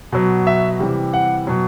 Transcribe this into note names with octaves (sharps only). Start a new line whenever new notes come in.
B2 F#3
E5
C3 E3 G3
F#5
B2 F#3